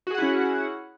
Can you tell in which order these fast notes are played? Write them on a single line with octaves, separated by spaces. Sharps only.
F#4 G#4 F#5 E4 C#4